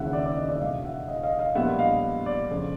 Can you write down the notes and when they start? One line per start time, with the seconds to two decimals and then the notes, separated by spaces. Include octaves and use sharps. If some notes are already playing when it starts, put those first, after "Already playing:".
Already playing: E1 D#2 C#3 E5 F#5
0.13 D5 E5
0.26 D5
0.37 D#5
0.49 D5 E5
0.60 E1 E2 B2 D#5 F5
0.85 E5 F#5
1.08 D#5 F5
1.23 D#5 F5
1.39 D#5 F5
1.55 A#1 A#2 G3 B3 E5 F#5
1.79 D#5 F5
2.26 D5
2.50 F2 C#3